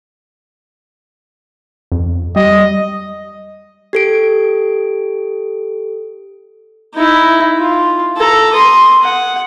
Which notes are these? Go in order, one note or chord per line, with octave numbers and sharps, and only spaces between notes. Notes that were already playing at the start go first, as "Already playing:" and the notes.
F2
G3 D#5
G4 A4 D7
D#4 E4
F4
A4 A#5
C6 D#6
F#5